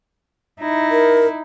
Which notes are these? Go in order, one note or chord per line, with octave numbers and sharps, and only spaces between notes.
D#4 E4
A#4